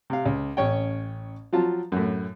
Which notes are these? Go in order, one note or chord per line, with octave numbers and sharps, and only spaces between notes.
C3 F5
C#2
A1 C#4 C#5 G5
F3 F#3 F4 A5
F#2 A2